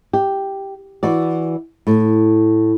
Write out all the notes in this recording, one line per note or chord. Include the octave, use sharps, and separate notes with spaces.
G4
E3 F#4 D5
A2